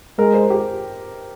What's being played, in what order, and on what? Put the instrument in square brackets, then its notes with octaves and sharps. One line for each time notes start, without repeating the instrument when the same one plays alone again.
[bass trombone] G#3 [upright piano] A#4
[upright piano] C5
G4